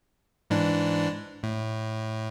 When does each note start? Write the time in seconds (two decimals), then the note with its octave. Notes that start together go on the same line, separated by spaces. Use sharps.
0.50 G#2 E3 D4
1.43 A2